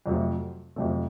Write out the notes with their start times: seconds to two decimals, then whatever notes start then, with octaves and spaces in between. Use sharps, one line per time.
0.06 F2 C3 F#3 A3
0.76 F2 C3 F#3 A3